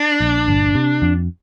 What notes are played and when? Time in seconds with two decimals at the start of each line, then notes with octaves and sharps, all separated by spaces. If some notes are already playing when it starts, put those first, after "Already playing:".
Already playing: D4
0.20 A#1
0.48 G1
0.75 C3
1.02 F2